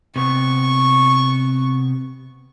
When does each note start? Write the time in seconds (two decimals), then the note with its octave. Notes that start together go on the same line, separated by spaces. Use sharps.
0.16 C3 B3 C#6